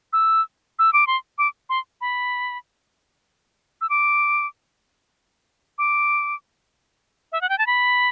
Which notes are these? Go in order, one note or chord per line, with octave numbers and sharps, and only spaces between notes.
E6
E6
D6
C6
D6
C6
B5
E6
D6
D6
E5
F#5
G5
A5
B5